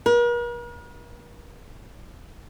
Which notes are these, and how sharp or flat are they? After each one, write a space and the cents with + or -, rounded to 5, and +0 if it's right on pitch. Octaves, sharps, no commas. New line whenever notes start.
A#4 +45